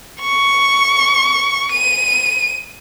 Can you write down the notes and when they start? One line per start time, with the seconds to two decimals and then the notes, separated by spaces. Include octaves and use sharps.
0.22 C#6
1.72 D#7